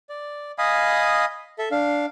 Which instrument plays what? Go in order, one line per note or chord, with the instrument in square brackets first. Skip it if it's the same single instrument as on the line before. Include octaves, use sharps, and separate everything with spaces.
[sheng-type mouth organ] D5
D#5 F5 G#5 B5 D#6
A4 E5
D4 F5